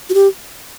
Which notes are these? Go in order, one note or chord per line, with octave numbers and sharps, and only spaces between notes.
F#4
G4